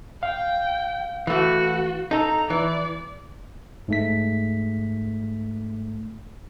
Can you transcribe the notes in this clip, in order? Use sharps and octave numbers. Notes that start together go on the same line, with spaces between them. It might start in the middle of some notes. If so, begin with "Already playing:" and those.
F5 G5
E3 A3 F#4
D#4 A4 A#5
E3 D5
G#2 A3 B6